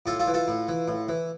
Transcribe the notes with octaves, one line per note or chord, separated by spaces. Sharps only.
A2 F4 A4
F4 A4
E3
F4 A4
A2
E3
A2
E3